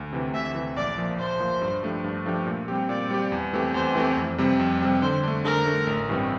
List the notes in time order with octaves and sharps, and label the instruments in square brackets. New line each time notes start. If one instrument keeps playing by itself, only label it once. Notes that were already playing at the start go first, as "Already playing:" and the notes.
Already playing: [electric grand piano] D2
C3 E3
[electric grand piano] D2 [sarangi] E5
[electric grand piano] C3 E3
[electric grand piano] A#1 [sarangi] D5
[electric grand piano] A#2 F3
[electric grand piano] A#1 [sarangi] C5
[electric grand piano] A#2 F3
G2
F3 A3 D4 G4
G2
F3 A3 D4 G4
A#2
G3 C4 G4
[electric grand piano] A#2 [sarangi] D5
[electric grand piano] G3 C4 G4
E2
E3 A3 C4 G4
[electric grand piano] E2 [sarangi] C5
[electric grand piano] E3 A3 C4 G4
F2
C3 G3 C4
F2
C3 G3 C4
[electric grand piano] D3 [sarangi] C5
[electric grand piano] A3 D4
[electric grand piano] D3 [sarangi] A#4
[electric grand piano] A3 D4
A1
G2 E3 G3 C4